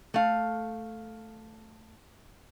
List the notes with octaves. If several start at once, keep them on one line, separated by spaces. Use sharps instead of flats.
A3 F5